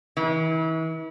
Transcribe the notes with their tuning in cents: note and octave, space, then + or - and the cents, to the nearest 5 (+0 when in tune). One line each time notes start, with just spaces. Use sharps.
E3 -40